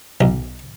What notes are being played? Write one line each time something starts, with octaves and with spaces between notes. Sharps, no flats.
B1